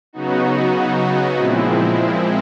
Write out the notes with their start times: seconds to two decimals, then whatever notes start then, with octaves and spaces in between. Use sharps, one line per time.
0.13 C#3 F#3 B3 D#4 F#4
1.37 A#2 F3 G#3 C4 E4